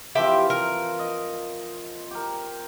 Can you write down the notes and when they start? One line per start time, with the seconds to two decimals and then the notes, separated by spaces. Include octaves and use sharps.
0.15 E3 F3 C4 G4 E5 G5
0.50 A#4
0.99 D#5
2.11 G4 A#4